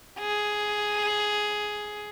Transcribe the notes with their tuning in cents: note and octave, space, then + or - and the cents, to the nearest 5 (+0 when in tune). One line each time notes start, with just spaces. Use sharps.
G#4 +5